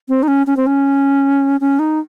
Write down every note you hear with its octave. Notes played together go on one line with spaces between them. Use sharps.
C4
D#4
C#4
C#4
C4
C#4
C#4
D#4